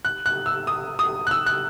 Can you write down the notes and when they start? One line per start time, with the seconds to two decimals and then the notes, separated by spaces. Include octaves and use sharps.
0.05 F#6
0.26 F#6
0.46 E6
0.67 D#6
0.99 D#6
1.27 F#6
1.31 E6
1.46 F#6